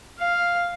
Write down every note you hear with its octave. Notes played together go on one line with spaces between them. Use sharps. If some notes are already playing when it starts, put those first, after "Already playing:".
F5